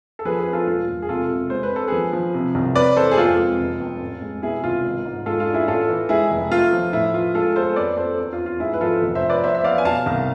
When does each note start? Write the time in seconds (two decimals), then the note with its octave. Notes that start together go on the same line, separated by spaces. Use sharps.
0.19 A4
0.25 F3 G#4 B4
0.39 G#4 B4
0.46 C4
0.53 F4 A4
0.67 E1 F4
0.88 E1
1.02 G#4
1.09 C3 F4 A4
1.30 C3
1.50 G#3 C5
1.63 B4
1.71 C4 A4
1.88 F3 G#4 B4
2.13 F3
2.34 C3
2.55 C2
2.75 C3 B4 D5
2.97 E3 A4 C5
3.11 G#4
3.18 F2 F4 A4
3.38 G#3
3.59 F1
3.80 F2
4.01 A1
4.22 G#3
4.42 B2 E4 G#4
4.64 C2 F4
4.84 G#1
5.05 G#2
5.26 G#3 F4 A4
5.40 F4
5.47 D4
5.54 E4 G#4
5.68 A1 F4 A4
5.89 E3
6.09 G#3 E4 G#4
6.30 F1
6.51 A3 F4
6.73 F3
6.93 A2 E4
7.14 E3 F4
7.35 G#3 F4 A4
7.56 G#3 A4 C5
7.76 F2 B4 D5
7.97 F2 A4 C5
8.18 E2
8.33 F4
8.39 E2
8.46 F4
8.60 G#2 E4 G#4
8.74 B4
8.81 F3 F4 A4
9.02 F1
9.15 C5 E5
9.22 F3
9.29 B4 D5
9.43 B3 C5 E5
9.55 E5
9.64 B3 D5 F5
9.78 G#5
9.85 B2 F5 A5
10.06 C2